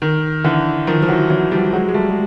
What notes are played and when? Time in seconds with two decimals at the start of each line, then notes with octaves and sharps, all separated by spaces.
0.02 D#3
0.44 D3 E3
0.87 D#3 F3
1.02 F3
1.08 E3 F#3
1.30 E3 F#3
1.51 F3 G3
1.73 F#3 G#3
1.88 G#3
1.94 G3 A3
2.10 G#3